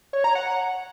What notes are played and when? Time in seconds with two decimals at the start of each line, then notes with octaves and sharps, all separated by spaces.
0.13 C#5
0.24 A#5
0.35 F#5